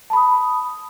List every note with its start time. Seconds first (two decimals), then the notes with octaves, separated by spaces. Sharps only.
0.10 A5
0.13 B5
0.16 D#6